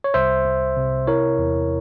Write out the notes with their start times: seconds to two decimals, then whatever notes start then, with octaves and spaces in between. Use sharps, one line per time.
0.04 C#5
0.14 C2 C5 E5
0.45 C2
0.77 C3
1.07 E4 A#4 C#5
1.39 E2